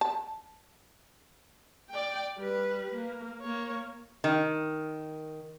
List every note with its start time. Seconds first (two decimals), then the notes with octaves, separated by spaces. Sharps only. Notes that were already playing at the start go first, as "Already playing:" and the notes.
0.01 A5
1.90 D5 G5
2.39 G3 B4
2.94 A#3
3.41 A#3 C#5
4.24 D#3